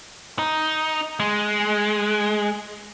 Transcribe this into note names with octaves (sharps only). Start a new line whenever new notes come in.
D#4
G#3